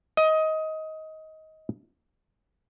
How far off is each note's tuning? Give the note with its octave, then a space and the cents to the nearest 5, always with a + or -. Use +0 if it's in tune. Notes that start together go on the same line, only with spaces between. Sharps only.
D#5 +20